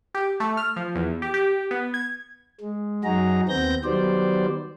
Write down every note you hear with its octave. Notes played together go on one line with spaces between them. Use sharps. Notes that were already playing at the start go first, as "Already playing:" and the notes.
G4
A3
F6
F3
E2
G4
G4
B3
G#6
G#3
F#2 F#3 D#4 F#4 G#4 A#5
D#2 B3 C4 G6 A#6
D#3 F#3 G3 B3 C5 D5